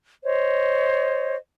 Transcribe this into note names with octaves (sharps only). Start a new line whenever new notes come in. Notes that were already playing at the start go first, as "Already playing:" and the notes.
C5 C#5 D#5